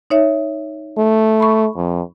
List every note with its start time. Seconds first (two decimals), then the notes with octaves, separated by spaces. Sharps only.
0.10 D#4 C#5 E5
0.98 A3
1.40 B5 C#6
1.76 F2